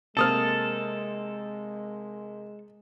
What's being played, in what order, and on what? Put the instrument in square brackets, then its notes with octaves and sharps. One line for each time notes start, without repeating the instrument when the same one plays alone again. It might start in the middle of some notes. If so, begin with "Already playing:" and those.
[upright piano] C3 A#3 C4 [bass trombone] G#3 [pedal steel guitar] A4 [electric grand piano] A5 D#6 F6